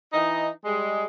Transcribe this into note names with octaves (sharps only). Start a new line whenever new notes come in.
E3 D#4
G3 G#3